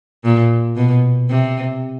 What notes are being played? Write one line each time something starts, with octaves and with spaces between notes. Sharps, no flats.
A#2
B2
C3